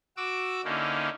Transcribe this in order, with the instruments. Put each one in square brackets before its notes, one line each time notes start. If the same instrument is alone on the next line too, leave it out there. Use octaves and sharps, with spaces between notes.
[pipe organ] F#4 D6 E6
D3 A#3 C#4 D#4 E4